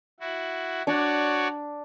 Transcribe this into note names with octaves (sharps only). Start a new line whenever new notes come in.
E4 F#4
D4 F#4 C#5 D5